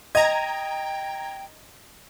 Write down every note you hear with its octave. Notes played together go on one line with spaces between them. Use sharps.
D#5 G5 A#5 G#6